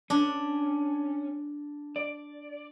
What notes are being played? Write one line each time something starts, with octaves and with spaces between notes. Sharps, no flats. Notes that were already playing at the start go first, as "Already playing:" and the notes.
C#4 D4
D5